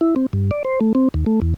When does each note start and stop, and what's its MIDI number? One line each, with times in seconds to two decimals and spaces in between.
0.01 0.15 64
0.16 0.26 60
0.33 0.51 43
0.51 0.63 74
0.65 0.80 72
0.81 0.93 57
0.95 1.09 60
1.14 1.25 39
1.26 1.40 57
1.42 1.54 40